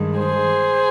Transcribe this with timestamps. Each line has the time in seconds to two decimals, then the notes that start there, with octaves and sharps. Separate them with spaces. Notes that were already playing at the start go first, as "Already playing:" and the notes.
Already playing: G2 D#3 G#3
0.19 G#4 C5